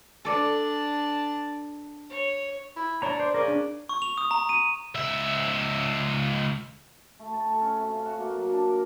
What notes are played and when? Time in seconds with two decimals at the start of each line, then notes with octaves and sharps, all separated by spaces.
0.25 D4 A4 D5 A5
2.10 C#5
2.76 E4
3.02 D4 C#5 A#5
3.20 C5 D5
3.34 C#3 A#4 D5
3.48 D4
3.89 C#6
4.02 F7
4.18 D#6
4.31 A#5
4.49 D#7
4.95 C#2 E5
7.19 A3
7.33 A5
7.47 A4
7.61 C#4
7.77 C3
7.95 F5
8.06 F#4
8.18 A#3
8.35 F#3
8.50 D4
8.67 A#4